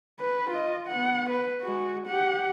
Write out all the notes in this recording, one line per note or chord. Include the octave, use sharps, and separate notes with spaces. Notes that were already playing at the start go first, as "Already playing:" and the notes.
B4
F4 D#5
B3 F#5
B4
G#3 F#4
G4 F#5